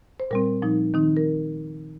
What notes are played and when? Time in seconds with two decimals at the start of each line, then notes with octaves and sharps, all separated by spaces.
0.20 C5
0.31 A#2 G3 C4 A#4
0.62 A#2 F3 D#4
0.94 D#3 C4 D#4
1.17 A#4